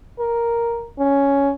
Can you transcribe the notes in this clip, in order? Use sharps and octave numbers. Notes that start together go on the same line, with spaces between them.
A#4
C#4